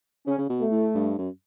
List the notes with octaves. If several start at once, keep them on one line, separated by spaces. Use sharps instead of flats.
C#3 C#4
C#3
B2
A3
A2
G2
F#2